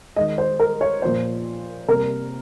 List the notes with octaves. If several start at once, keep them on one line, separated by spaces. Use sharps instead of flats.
D#3 G#3 D#5
C5
A#4
C#5
A#2 F3 A#3 C5
C3 G3 A#3 A#4